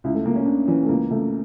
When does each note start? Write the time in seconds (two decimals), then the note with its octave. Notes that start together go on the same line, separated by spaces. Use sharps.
0.04 C#2 E4
0.14 A3
0.25 C#2 A#3
0.36 C#4
0.46 C#3 D4
0.68 E3 C#4
0.85 A3
0.89 C#2 A#3
1.10 C#2 A3